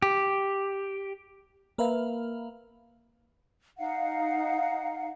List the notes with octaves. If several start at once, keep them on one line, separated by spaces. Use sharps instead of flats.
G4
A#3 A#4 B4 E5 F5
D#4 F5 F#5